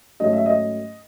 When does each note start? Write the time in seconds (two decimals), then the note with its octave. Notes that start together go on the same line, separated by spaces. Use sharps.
0.20 G#2 F#3 A3 C#4 D#5
0.33 E5
0.46 D#5